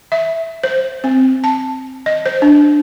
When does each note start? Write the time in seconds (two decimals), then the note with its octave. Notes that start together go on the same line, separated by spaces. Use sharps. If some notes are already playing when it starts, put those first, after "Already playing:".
0.12 E5
0.64 C5
1.04 C4
1.44 A5
2.06 D#5
2.26 C5
2.42 D4